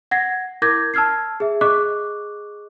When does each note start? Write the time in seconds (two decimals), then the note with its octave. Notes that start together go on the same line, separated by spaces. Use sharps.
0.11 F#5 G#6 A#6 C7
0.62 E4 A#4 D6 G6 G#6 A#6
0.94 A5 E6 F6 G#6 C7
1.40 G#4 E5
1.61 G#4 D#5 C#6 D6 F#6